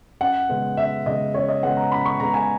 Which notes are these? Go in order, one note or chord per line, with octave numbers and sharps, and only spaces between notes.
F#2 F#5
C#3 G#3 B3
F#2 E5
C#3 G#3 B3 D#5
F#2 C#5
D#5
C#3 G#3 B3 F#5
A#5
F#2 B5
C#6
C#3 G#3 B3 A#5
G#5